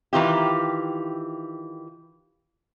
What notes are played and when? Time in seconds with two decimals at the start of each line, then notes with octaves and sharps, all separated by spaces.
0.13 D#3 E3 F4 G4